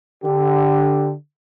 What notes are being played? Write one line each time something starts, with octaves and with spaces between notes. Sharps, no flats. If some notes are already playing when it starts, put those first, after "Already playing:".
D3 G4